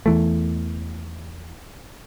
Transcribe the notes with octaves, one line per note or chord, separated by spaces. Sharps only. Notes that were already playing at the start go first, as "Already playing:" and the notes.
E2 E3 A3